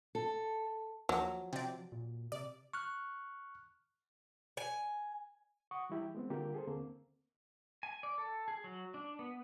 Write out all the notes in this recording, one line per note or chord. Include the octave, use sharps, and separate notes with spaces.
A4
D#2 F3 F#3
C3 D5
A#2
C3 D5
C#6 F6 F#6
G#5
F#5 C#6 D#6
E3 G3 E4 G4
G#3 B3 C4
D3 G3 A#3 F4 G4 A#4
G#4 A4 C5
D#2 D3 A#3 C4
G#5
D5
A4
G#4
F#3
D4
B3